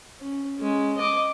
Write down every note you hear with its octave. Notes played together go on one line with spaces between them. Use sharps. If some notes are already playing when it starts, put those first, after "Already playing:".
C#4
G#3 C#4
D#5 D6